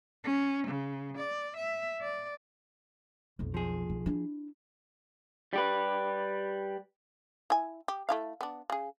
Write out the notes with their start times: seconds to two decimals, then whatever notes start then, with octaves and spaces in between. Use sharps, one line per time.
0.24 C#4
0.67 C#3
1.17 D5
1.57 E5
2.02 D5
3.39 B1 F2
3.54 F3 G#4
3.89 B1
4.06 D4 E4
5.53 G3 G4 B4
7.50 E4 G#5
7.88 G4
8.09 A3 E4 F5
8.41 B3 D4
8.70 C#3 G#4